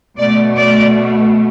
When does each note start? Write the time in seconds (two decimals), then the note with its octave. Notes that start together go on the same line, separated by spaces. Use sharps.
0.18 B2 A3 D5
0.58 D5